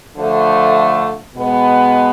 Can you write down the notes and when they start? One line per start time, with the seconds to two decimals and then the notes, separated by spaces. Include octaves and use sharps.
0.16 D3 F3 A3
1.35 B2 G#3 B3